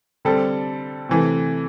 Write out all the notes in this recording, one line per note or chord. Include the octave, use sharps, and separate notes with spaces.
D3 G3 C4 A4
C3 E3 A3